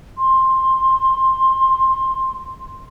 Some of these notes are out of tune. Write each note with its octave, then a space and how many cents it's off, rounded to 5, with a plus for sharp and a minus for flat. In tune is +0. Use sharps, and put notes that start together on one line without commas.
C6 +10